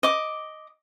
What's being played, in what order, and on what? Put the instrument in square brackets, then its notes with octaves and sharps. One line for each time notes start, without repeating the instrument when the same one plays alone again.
[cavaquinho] D#5 D6